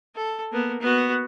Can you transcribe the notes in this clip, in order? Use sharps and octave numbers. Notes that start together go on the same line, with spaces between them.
A4
A#3 B3
B3 F#4